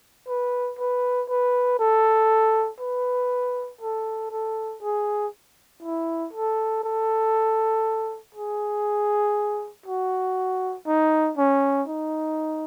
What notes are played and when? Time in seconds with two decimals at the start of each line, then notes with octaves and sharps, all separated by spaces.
0.28 B4
0.79 B4
1.29 B4
1.79 A4
2.80 B4
3.81 A4
4.31 A4
4.82 G#4
5.83 E4
6.33 A4
6.83 A4
8.35 G#4
9.86 F#4
10.87 D#4
11.37 C#4
11.88 D#4